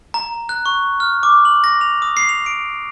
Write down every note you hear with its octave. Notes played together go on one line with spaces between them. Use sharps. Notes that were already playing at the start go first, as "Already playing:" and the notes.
A#5
F#6
C#6
F6
D6
F#7
A#6
F7
D#6
C7
F7
D7